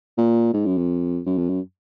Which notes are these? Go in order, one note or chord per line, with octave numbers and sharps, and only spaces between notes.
A#2
G#2
F#2
F2
F#2
F2
F#2